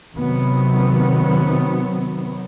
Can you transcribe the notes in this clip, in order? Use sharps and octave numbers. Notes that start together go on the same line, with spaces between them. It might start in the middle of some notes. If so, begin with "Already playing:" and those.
C3 D#3 F#3 B3